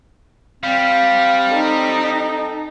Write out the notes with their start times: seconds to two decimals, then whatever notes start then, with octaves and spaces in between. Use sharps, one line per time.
0.63 G3 C4 F5
1.51 D#4 A4